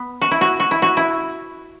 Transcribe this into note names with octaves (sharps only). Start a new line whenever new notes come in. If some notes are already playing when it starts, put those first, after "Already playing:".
Already playing: B3
F#4
E4
F#4
F#4
E4
F#4
E4